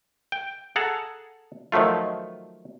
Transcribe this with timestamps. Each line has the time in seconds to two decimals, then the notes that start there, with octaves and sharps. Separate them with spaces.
0.32 G5
0.76 G#4 A4 F#5 A5 A#5
1.72 D#3 F3 F#3 A3 F4